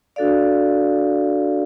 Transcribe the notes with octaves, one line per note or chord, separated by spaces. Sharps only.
D4 F#4 A4 D5 F5